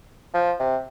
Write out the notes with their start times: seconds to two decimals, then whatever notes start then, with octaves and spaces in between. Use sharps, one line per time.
0.34 F3
0.59 C3